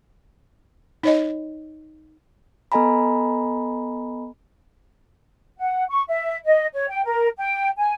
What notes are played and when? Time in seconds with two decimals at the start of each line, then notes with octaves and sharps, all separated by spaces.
1.03 D#4 C#5 D#5
2.72 B3 A4 D#5 G#5 A#5 B5
5.59 F#5
5.89 C#6
6.07 E5
6.45 D#5
6.73 C#5
6.89 G5
7.05 A#4
7.38 G5
7.77 G#5